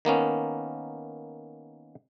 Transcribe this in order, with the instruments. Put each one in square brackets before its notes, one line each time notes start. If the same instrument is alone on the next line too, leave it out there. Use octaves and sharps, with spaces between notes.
[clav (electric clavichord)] D#3 A#3 B3 C#4